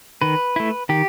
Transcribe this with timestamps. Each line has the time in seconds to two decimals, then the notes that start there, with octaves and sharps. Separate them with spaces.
0.22 D#3 B4
0.56 A3 E4
0.89 D#3 G4